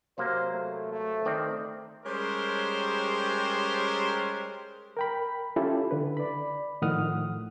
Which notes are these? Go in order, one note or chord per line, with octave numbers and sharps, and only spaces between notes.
C3 F#3 A#3 C5
A3
A3
D#3 C4 D5
G3 G#3 C#4 G4 A#4 C5
A#4 G5 B5
C#4 E4 F4 G4 A4
D3 B4
D5 B5
A2 D#3 F3 F#5 D#6 F6